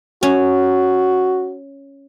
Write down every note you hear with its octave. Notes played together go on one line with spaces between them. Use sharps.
C#4 F#4